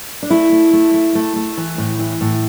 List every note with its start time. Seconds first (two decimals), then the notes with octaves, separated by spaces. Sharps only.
0.23 D4
0.30 A3 E4
0.52 A3
0.73 A3
0.94 A3
1.15 A3
1.36 A3
1.57 E3
1.78 A2
1.99 E3
2.21 A2